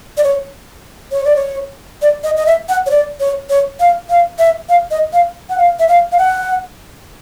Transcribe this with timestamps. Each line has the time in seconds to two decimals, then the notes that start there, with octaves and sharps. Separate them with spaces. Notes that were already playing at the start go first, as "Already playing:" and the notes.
0.17 D5
0.24 C#5
1.12 C#5
1.25 D5
1.36 C#5
2.02 D5
2.24 D#5
2.37 D#5
2.46 E5
2.69 F#5
2.86 C#5
2.90 D5
3.20 C#5
3.50 C#5
3.80 F5
4.10 F5
4.39 E5
4.69 F5
4.91 D#5
5.13 F5
5.50 F#5
5.58 F5
5.79 E5
5.88 F5
6.12 F5
6.18 F#5